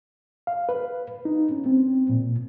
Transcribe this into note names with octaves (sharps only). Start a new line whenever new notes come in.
F5
B4
D#4
C#4
C4
A#2